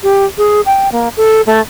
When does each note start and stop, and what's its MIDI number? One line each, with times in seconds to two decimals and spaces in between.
0.03 0.25 67
0.38 0.61 68
0.66 0.91 79
0.92 1.09 58
1.17 1.41 69
1.46 1.60 57